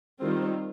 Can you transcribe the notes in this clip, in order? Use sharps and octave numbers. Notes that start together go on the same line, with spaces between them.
D#3 G3 C4 F4